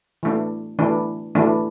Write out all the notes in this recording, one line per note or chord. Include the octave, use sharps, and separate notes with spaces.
E3 A3 D4
E3 A3 D4
E3 A3 D4